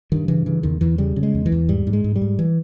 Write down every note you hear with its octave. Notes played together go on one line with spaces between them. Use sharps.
G2 D#3
C#3 E3
C#3 E3
E2 D#3
E2 E3
C#3 G3
C#3
G#3
E2
E3
E2
G#2 G3
G#2
G#3
G#2
G3
G#2
E3